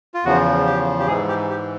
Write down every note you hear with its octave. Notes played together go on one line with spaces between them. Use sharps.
F4
E2 C#3 F3 F#4
G4
G4
G#2 E3 G#4
G4
G4